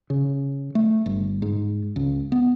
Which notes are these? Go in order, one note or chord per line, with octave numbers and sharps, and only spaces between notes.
C#3
A3
G1
G#2
C#2
B3